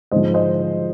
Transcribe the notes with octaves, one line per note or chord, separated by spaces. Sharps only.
G#2 F3 C5 D#5
C5 D#5